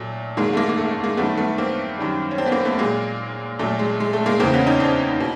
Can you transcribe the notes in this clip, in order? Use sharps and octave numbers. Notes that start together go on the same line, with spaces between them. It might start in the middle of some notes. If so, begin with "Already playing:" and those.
Already playing: A#2 F#3 A3
G#2 D#3 F#3 G#3 A#3
A3
G#3 A#3
A#3
A3
A3
G#3 A#3
G2 D#3 F#3 A3 B3
A3 B3
A#3 C4
F#2 D#3 G3
C#4
C4 D4
B3
A#3 C4
A3 B3
A#2 F#3 G#3 A#3
A#2 F#3 A3
G#3
G#3
A3
G#3 A#3
E2 C#3 E3 A#3 C4
B3 C#4
C#4 D#4
C4 D4
B2